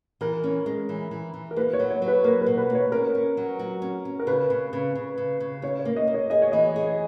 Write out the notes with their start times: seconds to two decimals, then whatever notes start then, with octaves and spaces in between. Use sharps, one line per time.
0.21 E3 A#4
0.44 C#4
0.66 G#3
0.89 E3
1.11 E3
1.34 E3
1.51 A#4
1.56 A#3 B4
1.73 C#5
1.80 F#3
1.90 C#5
2.02 F#3
2.08 B4
2.24 A#3 A#4
2.41 B4
2.46 B2
2.58 B4
2.70 A#3
2.75 C#5
2.92 C#4 A#4
3.15 C#4
3.37 F#3
3.59 F#4
3.82 C#4
4.05 C#4
4.19 A#4
4.27 C#3 B4
4.50 C#3
4.73 C#3
4.95 C#3
5.18 C#3
5.40 C#3
5.62 C#4 C#5
5.80 C#5
5.85 A#3
5.96 D#5
6.07 A#3
6.14 C#5
6.30 G#4 D#5
6.42 C#5
6.52 E3 D#5
6.76 G#4